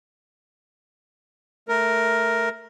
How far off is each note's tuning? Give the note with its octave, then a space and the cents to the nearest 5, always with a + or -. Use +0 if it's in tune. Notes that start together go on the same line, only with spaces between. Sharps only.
A3 +0 A#4 +0